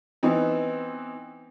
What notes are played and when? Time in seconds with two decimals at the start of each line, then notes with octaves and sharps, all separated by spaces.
0.23 E3 B3 C4 D#4